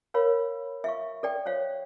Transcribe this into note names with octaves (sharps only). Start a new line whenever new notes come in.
A#4 C#5 F5 B5
E5 F5 C#6
A4 D5 G5
C5 C#5 F5